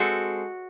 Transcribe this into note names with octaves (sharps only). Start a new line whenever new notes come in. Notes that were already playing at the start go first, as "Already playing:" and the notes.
Already playing: G#3 C4 F#4 A4